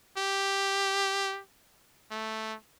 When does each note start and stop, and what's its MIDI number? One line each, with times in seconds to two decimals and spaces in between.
0.18 1.40 67
2.11 2.55 57